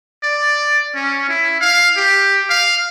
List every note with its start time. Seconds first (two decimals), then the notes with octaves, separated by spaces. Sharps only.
0.23 D5
0.95 C#4
1.29 E4
1.61 F5
1.97 G4
2.50 F5